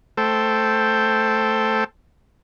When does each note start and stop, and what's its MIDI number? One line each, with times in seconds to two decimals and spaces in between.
0.17 1.84 57
0.17 1.84 69
0.17 1.84 72
0.17 1.84 79